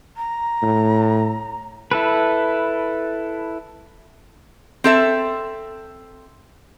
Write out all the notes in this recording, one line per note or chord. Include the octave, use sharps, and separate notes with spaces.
A#5
A2
E4 A4 B4
C4 A4 E5